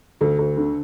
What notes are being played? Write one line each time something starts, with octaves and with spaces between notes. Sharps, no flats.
D2 A4
D2
D3